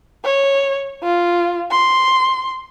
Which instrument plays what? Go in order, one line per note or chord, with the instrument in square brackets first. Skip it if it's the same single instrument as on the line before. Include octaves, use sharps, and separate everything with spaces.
[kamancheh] C#5
F4
C6